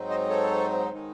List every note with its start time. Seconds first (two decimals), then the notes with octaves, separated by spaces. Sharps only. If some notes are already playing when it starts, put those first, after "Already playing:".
Already playing: G#2 F#3 C4 D#4
0.10 C5 D#5
0.29 A4 C#5
0.92 D#3 G#3 D#4